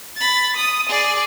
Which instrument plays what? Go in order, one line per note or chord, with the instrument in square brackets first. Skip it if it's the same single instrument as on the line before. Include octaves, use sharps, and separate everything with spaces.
[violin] B5 A6
D#6
G#4 D5